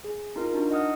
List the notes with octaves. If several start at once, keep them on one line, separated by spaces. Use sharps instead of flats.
G#4
D#4 F4 A#4
D4 D#4 F#4
D#5 F#5 D#6 F6